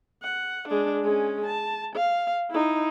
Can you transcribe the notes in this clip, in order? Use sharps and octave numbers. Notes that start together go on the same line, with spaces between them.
F#5
G#3 D4
G#3 C#4
A5
F5
D#4 E4